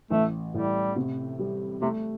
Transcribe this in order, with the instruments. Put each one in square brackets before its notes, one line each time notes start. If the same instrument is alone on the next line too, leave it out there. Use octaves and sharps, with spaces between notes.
[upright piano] A1 [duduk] A3
[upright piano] A2 [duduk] G3
[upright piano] C3
G3
[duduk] C3 [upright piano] A3